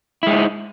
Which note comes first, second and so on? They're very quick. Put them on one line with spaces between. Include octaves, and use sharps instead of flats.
E4 G#3 D#4